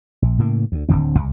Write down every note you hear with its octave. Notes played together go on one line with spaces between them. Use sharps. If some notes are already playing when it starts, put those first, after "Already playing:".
A#1
A2 C#3 A#3
D2
D1 D#2 D3 C4
C2